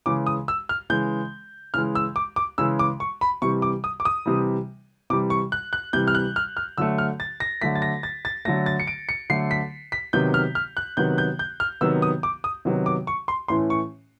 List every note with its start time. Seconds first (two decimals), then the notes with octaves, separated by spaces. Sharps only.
0.06 C#3 E3 G#3 D6
0.27 D#6
0.48 E6
0.69 F6
0.90 C#3 E3 G#3 G6
1.74 C#3 E3 G#3 F6
1.95 E6
2.16 D6
2.36 D6
2.58 C#3 E3 G#3 E6
2.79 D6
3.00 C#6
3.21 B5
3.42 C3 E3 G3 C#6
3.62 D6
3.84 D#6
4.00 D6
4.05 D#6
4.26 C3 E3 G3
5.10 C3 E3 G3 D6
5.30 C#6
5.52 F#6
5.73 F#6
5.93 C3 E3 G3 G6
6.08 F6
6.15 F#6
6.36 F6
6.57 F6
6.78 D3 F#3 A3 E6
6.98 F6
7.20 A6
7.40 A#6
7.62 D3 F#3 A3 B6
7.75 A6
7.82 A#6
8.03 A6
8.25 A6
8.45 D3 F#3 A3 A#6
8.66 A6
8.80 C#7
8.87 D7
9.09 C#7
9.29 D3 F#3 A3 C7
9.51 B6
9.92 B6
10.13 C3 D#3 F#3 B3 G6
10.34 F6
10.55 F6
10.77 F#6
10.97 C3 D#3 F#3 B3 G6
11.18 G6
11.39 G6
11.60 F6
11.81 C3 D#3 F#3 B3 E6
12.02 D#6
12.23 D6
12.44 D#6
12.65 C3 D#3 F#3 B3
12.86 D6
13.07 C#6
13.28 C6
13.48 A2 E3 A3 C#4 C6
13.70 C#6